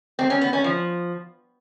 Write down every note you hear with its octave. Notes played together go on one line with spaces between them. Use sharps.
C4
C#4
B3
C#4
F3